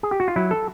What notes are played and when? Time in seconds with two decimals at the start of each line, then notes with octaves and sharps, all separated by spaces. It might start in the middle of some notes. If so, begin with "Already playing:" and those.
0.03 G#4
0.11 G4
0.20 F#4
0.28 F4
0.36 F#3 E4
0.51 A4